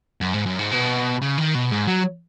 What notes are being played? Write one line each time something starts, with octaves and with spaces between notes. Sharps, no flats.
F#2
G#2
F#2
G#2
B2
C#3
D#3
B2
G#2
F#3